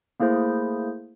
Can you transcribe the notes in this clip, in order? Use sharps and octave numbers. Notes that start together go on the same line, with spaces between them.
A3 A#3 E4 G#4 C5